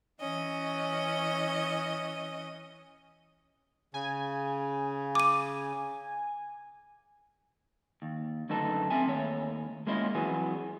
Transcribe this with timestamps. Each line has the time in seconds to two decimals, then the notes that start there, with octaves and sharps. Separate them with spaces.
0.20 E3 C#4 D#5
3.94 C#3 G#5
5.15 D6 D#7
8.02 D#2
8.49 F#2 D3 A3 B3 D#4 A4
8.90 C4 E5 G#5
9.07 D#2 A3 C#5
9.87 G#3 A#3 C#4 E4 F4 D#5
10.15 F2 E3 F#3 B3 G#4